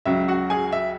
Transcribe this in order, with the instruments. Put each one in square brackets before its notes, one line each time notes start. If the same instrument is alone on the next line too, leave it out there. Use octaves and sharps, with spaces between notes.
[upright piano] C#2 C#3 F#3 E5
F#4 F#5
G#4 G#5
E5